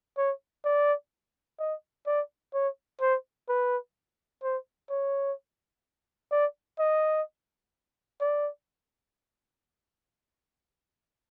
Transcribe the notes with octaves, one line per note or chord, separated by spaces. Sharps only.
C#5
D5
D#5
D5
C#5
C5
B4
C5
C#5
D5
D#5
D5